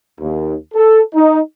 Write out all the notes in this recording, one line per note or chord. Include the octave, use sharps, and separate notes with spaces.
D#2
A4
D#4